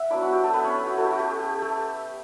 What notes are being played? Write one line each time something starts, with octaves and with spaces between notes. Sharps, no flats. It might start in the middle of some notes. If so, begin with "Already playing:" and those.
Already playing: E5 F#5
F#3 B3 D4 E4 D5
F#4
G4
A3 A4
B3 B4
C#4 C#5
F#4
A3 E4 A4
G4
F#4
G4
G4
A3 A4